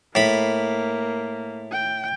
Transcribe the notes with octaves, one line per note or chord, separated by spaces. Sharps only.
A2 A#3 B5
G5